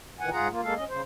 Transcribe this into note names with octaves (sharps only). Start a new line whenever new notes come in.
A#2 D#3 E3 F#5 G#5
G#2 F4 G#4 F#5 A#5
A#3 F4
G#3 A#3 A4 F5
C#4 D#5
C#3 C5